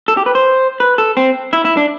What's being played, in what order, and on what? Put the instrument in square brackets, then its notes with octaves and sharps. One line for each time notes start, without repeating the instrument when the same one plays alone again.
[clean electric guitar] A4
G4
B4
C5
B4
A4
C4
E4
E4
D4